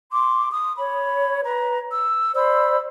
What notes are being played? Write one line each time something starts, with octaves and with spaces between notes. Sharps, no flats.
C6 D6
D#6
C#5 B5
B4 A#5
E6
C5 D5 B5 E6